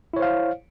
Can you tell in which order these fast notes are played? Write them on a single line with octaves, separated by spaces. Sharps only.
E4 C#5 C5 F5